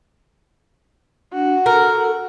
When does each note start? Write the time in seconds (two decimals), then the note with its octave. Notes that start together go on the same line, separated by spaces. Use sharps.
1.33 D4 F#4
1.66 A4 A#4